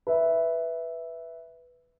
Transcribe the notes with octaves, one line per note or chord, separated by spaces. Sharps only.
B4 E5